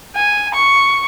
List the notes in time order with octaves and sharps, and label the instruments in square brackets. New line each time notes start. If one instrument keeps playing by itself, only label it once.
[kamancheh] G#5
C#6